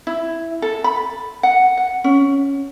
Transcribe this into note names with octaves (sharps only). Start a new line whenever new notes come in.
E4
A4
B5
F#5
F#5
C#4